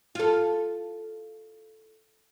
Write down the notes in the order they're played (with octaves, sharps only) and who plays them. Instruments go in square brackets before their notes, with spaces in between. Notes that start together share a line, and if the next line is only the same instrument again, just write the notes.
[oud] F4 A4